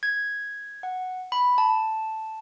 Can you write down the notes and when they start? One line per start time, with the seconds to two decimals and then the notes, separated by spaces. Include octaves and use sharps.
0.03 G#6
0.83 F#5
1.32 B5
1.58 A5